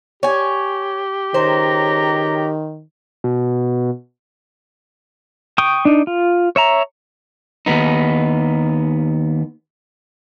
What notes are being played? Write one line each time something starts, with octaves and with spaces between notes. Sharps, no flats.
G4 C#5 G#5
C#2 D#3 C5 C#5 A#5
B2
G5 C#6 D#6
D4 D#4
F4
C#5 E5 A#5
D#2 G#2 B3 D#4